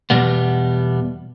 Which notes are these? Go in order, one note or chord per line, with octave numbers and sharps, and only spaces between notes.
E2 B2 G3 B3